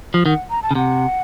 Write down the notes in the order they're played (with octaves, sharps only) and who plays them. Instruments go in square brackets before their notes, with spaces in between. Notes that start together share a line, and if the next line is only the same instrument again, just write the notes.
[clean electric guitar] F3
[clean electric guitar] D#3 [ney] F#5
[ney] A#5
A5
[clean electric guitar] C#3
[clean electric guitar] C3 [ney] F#5